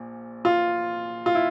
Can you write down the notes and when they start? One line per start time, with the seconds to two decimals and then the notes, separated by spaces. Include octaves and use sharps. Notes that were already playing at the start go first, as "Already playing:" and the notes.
Already playing: A#1 A#2
0.45 F4
1.26 F4
1.35 E4